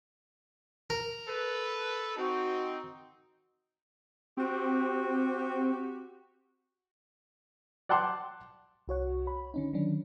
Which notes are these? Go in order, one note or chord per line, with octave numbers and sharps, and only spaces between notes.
A#4
A4 B4
C4 D#4 F#4
C4 F#4 G4
D5 F#5 G5 A5 C6 D6
C2 F#4 C#5 F#5
C#5 B5
D3 C#4 D#4
D3 D#3 F#3 C#4 D4